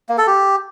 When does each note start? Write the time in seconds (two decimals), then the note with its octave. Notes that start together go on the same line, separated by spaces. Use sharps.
0.09 A#3
0.18 A4
0.27 G4